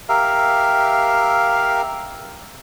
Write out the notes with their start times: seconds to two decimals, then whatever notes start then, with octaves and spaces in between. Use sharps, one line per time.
0.09 G4 A#4 E5 F5